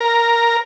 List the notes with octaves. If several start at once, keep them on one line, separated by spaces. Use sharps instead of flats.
A#4